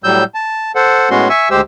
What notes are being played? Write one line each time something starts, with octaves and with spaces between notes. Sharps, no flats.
A2 F#3 G3 E6 G6
A5
A4 C5 F#5
A2 G#3 B3 C#4 F#4 C6
E5 G#5 C#6 E6
D2 G#3 G4 C5 E6